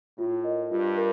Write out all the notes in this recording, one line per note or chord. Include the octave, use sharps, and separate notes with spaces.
A2 F4
A#4 D#5
G2 F4
A#4